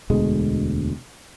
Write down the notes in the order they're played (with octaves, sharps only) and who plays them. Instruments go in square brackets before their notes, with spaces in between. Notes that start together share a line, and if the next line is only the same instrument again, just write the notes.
[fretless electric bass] E1 D2 B2 G#3